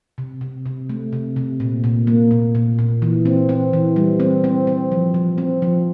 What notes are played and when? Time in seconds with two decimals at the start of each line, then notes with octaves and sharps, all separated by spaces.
0.18 C3
0.41 C3
0.66 C3
0.90 A3
1.13 C3
1.36 C3
1.60 A#2
1.84 A#2
2.07 A#3
2.31 A#2
2.55 A#2
2.79 A#2
3.02 E3
3.25 C4
3.49 C4
3.73 E3
3.96 G3
4.20 C4
4.44 C4
4.67 C4
4.92 F3
5.14 F3
5.38 C4
5.62 F3